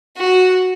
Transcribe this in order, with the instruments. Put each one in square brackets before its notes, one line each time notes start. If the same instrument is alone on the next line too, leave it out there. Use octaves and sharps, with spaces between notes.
[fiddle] F#4